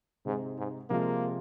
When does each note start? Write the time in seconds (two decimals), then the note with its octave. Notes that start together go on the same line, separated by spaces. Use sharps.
0.25 G#2 C3 G#3 C4 D#4
0.58 G#2
0.90 C3 F3 G#3 A#3 F4